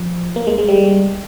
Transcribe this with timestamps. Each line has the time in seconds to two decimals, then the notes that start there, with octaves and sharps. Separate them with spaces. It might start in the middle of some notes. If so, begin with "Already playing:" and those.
Already playing: F3
0.36 A#3
0.47 G#3
0.58 G#3
0.68 G3